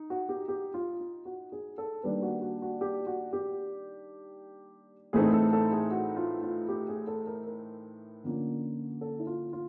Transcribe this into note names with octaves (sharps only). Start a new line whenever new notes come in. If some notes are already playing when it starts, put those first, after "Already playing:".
Already playing: D#4
F#4
G4
G4
F4
F4
F#4
G#4
A4
D#3 G3 A#3 D4 B4
F#4
F#4
F#4
G4
F#4
G4
A2 E3 A3 C4 D#4 G#4
A4
A4
G#4
F#4
F4
F4
G4
G#4
A4
A#4
A#4
D3 F3 A#3 C#4
A4
E4
F4
F4